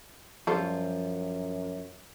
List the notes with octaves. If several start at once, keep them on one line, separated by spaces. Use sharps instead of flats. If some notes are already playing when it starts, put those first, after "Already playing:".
F#2 F3 G3 F4 A4 C5